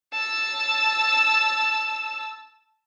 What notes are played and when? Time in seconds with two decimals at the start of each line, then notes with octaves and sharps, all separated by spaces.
0.13 A5 E6